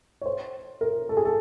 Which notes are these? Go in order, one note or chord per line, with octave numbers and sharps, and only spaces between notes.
C#5
C5
A#4
A4
G#4
A4